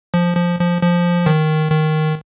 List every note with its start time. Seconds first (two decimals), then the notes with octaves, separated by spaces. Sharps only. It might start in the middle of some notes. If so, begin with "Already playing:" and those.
0.14 F3
0.37 F3
0.59 F3
0.82 F3
1.26 D#3
1.71 D#3